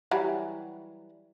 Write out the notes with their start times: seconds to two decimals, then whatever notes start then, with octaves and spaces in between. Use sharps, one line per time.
0.11 E3 F#3 G3